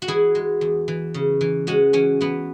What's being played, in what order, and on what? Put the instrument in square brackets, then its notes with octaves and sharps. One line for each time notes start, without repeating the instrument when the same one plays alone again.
[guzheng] F#4
E3 E4 G#4
G#3
E2
E3
C#3
E3
G#3 C#4 F#4
E3 C#4
E3 B3